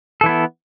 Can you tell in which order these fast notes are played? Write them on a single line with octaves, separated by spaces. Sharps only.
A4 E3 E4 B3